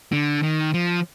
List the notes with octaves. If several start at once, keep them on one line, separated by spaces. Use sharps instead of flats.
D3
D#3
F3